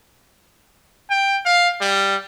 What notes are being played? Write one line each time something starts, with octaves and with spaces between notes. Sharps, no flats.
G5
F5
G3